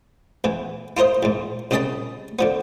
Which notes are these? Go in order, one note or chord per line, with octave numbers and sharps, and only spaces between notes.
E2 E3
E4 F4 A#4 C5 D#5
E2 G#2
C2 C#3 C#4 D#5 A5 B5
D3 F3 B3